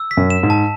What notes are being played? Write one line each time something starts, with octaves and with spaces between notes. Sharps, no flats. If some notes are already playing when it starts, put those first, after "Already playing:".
Already playing: E6
B6
F#2
E7
G#2
A5